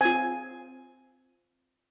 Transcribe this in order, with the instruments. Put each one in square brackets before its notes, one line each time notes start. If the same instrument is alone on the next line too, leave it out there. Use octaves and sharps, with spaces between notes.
[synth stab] C4 F4 [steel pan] G#5